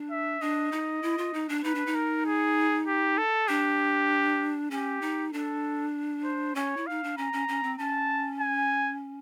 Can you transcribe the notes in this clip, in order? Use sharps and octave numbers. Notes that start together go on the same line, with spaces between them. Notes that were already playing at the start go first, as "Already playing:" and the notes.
Already playing: D4
E5
D4 D#5
D#4
E4
F4
D#4
D4
D#4 B4
D4
D#4
A#4
G#4
G4
A4
D4 G4
C#4 G4
D#4
D4 A4
C5
C#4 C#5
E4
D#4 F5
D4
C#4 A#5
C#4
C#4
C4
C#4 A5
G#5